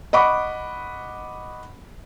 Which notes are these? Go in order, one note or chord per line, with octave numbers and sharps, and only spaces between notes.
D#5 F#5 B5 C#6 D6